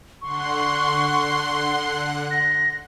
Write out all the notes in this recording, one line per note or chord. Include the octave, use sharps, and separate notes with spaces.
D3 F#5 C6 C#6 F#6
A#6